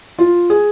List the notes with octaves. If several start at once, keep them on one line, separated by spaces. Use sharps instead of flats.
F4
G#4